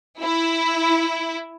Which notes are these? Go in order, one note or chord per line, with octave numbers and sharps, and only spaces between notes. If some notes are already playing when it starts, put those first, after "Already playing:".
E4